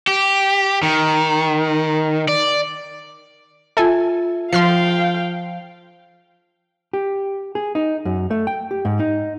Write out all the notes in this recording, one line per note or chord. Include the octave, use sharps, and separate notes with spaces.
G4
D#3
D5
F4 A4 E5 G#5
F3 F5 G5 C6 F6 C7
G4
G#4
D#4
F#2
A3
G5
G4
G#2
D#4